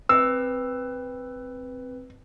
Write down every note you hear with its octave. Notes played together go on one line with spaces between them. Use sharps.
C4 B4 E6